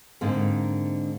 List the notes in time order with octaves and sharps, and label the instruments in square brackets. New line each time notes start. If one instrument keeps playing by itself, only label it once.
[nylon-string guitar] G#2 D3 A#3 C4